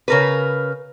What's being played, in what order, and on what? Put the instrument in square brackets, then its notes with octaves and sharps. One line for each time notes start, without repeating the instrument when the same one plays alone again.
[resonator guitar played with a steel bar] C#3 A#4 B4